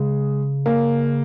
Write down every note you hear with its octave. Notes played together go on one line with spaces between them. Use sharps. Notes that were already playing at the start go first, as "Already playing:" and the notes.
Already playing: C#3 G#3
A#3